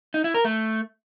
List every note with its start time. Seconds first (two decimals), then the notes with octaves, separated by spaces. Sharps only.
0.14 D#4
0.24 E4
0.34 A#4
0.45 A3